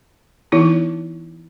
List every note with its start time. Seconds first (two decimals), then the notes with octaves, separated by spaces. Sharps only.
0.52 E3 B3 D#4 E4